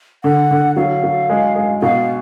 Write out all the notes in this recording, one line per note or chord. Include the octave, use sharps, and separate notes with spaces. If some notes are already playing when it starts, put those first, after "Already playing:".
D3 F#5
D3
F#3 F5
F#3
G#3
G#3
B2 F5